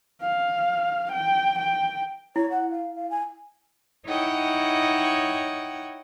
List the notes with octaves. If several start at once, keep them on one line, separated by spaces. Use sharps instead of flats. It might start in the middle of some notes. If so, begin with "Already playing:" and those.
F5
G5
G5
E4 C#5
F#5
F5
F5
G#5
D#4 E4 C#5 D#5 F#5 G5